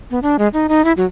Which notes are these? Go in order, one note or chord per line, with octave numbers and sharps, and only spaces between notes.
B3
D4
G#3
D#4
D#4
E4
F#3